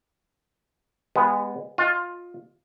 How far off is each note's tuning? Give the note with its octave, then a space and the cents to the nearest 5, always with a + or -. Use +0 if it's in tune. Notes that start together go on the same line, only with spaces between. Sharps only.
G#3 -25 B3 +0 G4 +20
F4 +15 D#5 +0